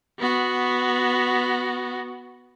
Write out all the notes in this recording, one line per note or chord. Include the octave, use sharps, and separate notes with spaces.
B3 F#4